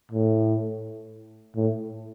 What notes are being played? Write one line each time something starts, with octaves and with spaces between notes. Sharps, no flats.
A2
A2